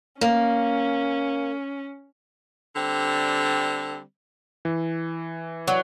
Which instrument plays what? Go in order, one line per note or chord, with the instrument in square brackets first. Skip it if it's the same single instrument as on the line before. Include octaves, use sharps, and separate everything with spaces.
[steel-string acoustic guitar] A#3 [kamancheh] C#4
[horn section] D3 G3 C4
[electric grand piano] E3
[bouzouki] F#3